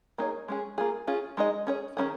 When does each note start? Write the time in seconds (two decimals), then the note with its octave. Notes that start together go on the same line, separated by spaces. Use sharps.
0.18 A#3 D#4 G#4 C#5
0.48 G#3 C#4 G#4
0.78 A#3 F4 G#4
1.07 C#4 F4 G#4
1.37 G#3 D#4 G#4 D#5
1.67 C#4 G#4 C#5
1.97 D#3 A#3 C#4 G#4